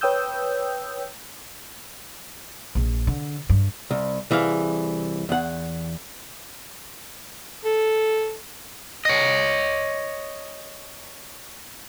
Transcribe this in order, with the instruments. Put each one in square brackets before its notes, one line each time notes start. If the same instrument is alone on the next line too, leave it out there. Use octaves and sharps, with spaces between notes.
[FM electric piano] B4 C#5 G5 D#6 E6 G6
[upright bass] A#1
D3
G2
[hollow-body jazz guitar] C2
C2 E3 G#4 F5
E2 F#5
[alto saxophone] A4
[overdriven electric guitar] C#5 D#5